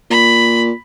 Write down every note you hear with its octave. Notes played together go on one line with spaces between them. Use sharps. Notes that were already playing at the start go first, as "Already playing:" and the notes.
A#2 B5